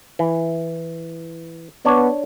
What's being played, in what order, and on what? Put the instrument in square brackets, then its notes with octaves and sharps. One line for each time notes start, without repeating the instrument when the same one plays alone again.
[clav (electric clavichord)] E3
[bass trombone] B3 [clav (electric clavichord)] D4 C#5 D5